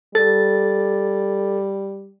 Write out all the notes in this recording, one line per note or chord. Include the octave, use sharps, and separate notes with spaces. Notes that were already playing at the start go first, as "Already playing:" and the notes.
G3 A4 A6